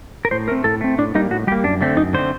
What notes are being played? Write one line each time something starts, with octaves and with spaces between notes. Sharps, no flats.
A#4
A2 C5
A3 C4 A#4
A2 A4
A3 C4
A2 D4
G3 A#3 D#4
A2 F#4
G3 A#3 G4
F#2 D4
D3 A3 C4
F#2 D#4
D3 A3 C4 C5